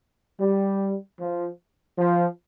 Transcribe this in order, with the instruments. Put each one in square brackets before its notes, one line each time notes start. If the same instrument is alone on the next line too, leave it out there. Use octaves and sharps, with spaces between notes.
[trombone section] G3
F3
F3